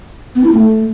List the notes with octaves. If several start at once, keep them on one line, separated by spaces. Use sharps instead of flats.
B3
E4
A3